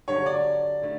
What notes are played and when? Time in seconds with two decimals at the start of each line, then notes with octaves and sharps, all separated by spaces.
0.08 G2 D3 F#3 C#5
0.26 D5
0.82 D3 A3 E4